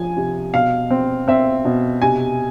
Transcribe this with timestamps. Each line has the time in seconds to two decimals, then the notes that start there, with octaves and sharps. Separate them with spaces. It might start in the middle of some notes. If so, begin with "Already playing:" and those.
Already playing: F3 G#5
0.17 C3
0.54 B2 F5
0.90 C4
1.28 C4 E5
1.65 B2
2.02 C3 G#5